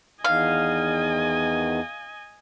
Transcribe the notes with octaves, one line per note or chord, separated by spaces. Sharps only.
E2 D#3 D#5 F5 G#5